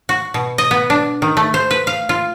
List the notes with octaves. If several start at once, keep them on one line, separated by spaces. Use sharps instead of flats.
F#4
B2
D#5
B3
D4
D#3
A3
C5
B4
F5
F4